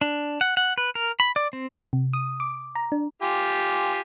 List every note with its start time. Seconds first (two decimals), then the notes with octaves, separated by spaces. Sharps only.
0.01 D4
0.41 F#5
0.57 F#5
0.78 B4
0.95 A#4
1.20 B5
1.36 D5
1.53 C4
1.93 C3
2.13 D#6
2.40 D6
2.75 A#5
2.92 D4
3.22 F4 G4 G#5